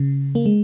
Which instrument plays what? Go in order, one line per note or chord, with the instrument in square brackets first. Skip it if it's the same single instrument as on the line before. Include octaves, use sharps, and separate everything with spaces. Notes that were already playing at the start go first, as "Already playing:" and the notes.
Already playing: [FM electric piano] C#3
A#3
G#3